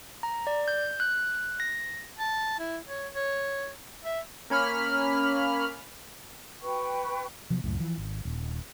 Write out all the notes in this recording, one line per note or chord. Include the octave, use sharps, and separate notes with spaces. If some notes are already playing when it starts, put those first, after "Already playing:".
A#5
D5
G6
F#6
A#6
A5
E4
C#5
C#5
E5
A#3 C#4 B5 F6
F#4 B4 G5 C#6
C3 F3 F#3 B3
C#2 F#2 A2
E3 F3
G#1
D#1